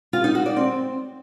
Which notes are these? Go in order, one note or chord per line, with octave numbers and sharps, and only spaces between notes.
F4
D#4
F#4
D5
C4